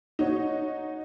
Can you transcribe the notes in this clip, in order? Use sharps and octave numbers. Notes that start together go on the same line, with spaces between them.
D#4 F#4 C#5